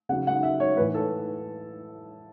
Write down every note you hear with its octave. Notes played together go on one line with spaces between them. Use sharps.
C#3 F#3 F#5
F#5
E5
C#5
A2 E3 B4
A4